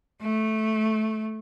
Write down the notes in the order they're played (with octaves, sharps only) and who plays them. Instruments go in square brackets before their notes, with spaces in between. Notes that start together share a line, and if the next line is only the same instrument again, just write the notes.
[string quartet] A3